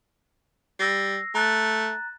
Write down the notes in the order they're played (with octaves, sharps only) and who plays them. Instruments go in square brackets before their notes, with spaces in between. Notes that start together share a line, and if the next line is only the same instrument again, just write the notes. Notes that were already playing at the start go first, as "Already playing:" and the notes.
[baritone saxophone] G3 [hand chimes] E6 A#6 C7
[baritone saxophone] A3 [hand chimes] A#5 F#6 A6